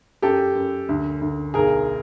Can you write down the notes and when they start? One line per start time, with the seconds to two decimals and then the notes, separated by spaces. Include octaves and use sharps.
0.22 F#2 G4 A4
0.55 F#2
0.89 D2
1.21 D2
1.54 B1 G#4 A#4